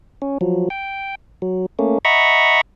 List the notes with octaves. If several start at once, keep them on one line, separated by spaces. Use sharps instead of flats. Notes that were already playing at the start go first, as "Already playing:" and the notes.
C#4
F3 F#3
G5
F#3
A3 A#3 C#4
D#5 E5 F#5 A#5 B5 C#6